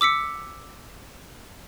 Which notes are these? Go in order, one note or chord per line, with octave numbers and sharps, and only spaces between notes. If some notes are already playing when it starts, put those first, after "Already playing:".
D6 E6 B6 C#7